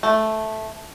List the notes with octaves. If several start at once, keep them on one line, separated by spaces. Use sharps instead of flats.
A3